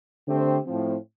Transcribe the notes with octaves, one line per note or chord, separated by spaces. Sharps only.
D3 A3 C4 G4 C5
A2 F3 C4